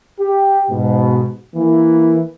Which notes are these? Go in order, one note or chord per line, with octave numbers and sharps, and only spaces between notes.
G4
G#2 B2
E3 A#3